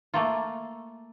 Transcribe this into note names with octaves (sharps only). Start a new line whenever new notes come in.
A3 A#3 F4